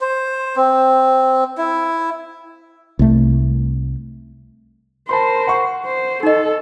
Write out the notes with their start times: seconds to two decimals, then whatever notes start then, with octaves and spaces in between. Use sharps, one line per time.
0.01 C5
0.56 C4
1.58 E4
2.99 C2 A3
5.09 A#4 C5 A5 B5 C6
5.47 F#5 C#6
5.85 C5
6.23 D#4 A4 D#5